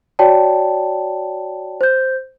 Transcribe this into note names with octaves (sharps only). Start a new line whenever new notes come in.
F#4 C#5 D5 G5 A5
C5 G6